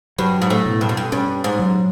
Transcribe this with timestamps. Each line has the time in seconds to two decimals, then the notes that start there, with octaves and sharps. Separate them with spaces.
0.19 G2 F#3
0.42 G#2
0.50 A2
0.66 B2
0.81 G2
0.89 F#2
0.97 G2
1.12 G2 C#4
1.44 G#2
1.59 F#3